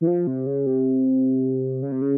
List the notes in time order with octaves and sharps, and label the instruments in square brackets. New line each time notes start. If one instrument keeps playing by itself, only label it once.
[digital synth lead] E3
F3
C3
C#3
C3
C#3
C3
C#3